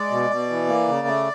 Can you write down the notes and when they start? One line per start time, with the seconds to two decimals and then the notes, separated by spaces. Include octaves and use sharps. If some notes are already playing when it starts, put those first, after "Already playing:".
Already playing: G#3 D5
0.11 B2
0.30 B2
0.50 E3
0.68 A#3
0.88 C#3
1.07 A3